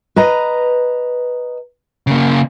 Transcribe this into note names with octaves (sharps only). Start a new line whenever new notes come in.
B4 D#5 A#5
C#3 A#3